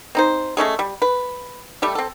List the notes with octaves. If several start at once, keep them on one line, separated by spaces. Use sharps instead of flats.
C4 D#4 C5
G#3 A3 C#4 G#4
G3
B4
G3 A3 G4
C4 A4